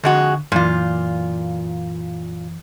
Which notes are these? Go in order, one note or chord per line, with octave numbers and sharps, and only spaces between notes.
F2 D3 G#3 F#4
F#2 A#2 E3 F4